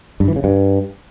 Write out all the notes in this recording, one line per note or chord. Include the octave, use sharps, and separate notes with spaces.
G2
E3
C#3
G2